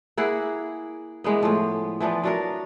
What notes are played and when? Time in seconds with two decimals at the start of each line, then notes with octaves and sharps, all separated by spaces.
0.17 A#3 E4 G#4 F#5
1.24 E3 G#3 A#3 B3
1.42 A2 F3
2.00 E3 F3 B3 D4
2.24 F#3 D4 A#4